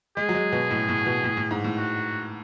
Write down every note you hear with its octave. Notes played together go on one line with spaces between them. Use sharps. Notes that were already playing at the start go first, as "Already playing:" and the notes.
G#3 G#4
F#3
G#3
B2
A2
A2
B2
A2
A2
G#2
A2
F#4